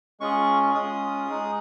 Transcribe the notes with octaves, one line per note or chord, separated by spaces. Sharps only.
G#3 C#4 F4 G#4 C#6
G#3 C#4 F4 G#4 D#6
G#3 D#4 G#4